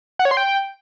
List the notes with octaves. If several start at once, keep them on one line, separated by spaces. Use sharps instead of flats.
F#5
C#5
C6
G5